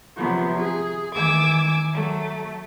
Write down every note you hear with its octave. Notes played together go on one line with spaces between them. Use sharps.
C3 F3 F#3 B3
G#4
D#3 E3 G#5 D6 E6 G#6
F#3 A3